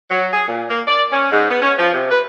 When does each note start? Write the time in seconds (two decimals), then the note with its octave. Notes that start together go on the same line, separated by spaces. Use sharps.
0.11 F#3
0.33 G#4
0.49 A#2
0.70 A#3
0.88 D5
1.13 C#4
1.32 G#2
1.50 B3
1.62 C#4
1.78 F3
1.94 C3
2.11 B4